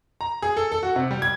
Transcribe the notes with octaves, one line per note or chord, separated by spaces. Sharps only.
A#5
G#4
A4
A4
F#4
C3
G3
G#6